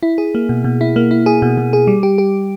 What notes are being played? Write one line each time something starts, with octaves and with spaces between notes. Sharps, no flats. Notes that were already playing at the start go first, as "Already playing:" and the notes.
E4
G#4
A#3
B2
B2
E4
A#3
E4
G#4
B2
B2
G#4
G3
G4
G4